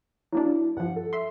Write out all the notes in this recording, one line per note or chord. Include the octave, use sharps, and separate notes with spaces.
F#3 A#3 D4 E4
G2 F3 F#5
A4
E5 C6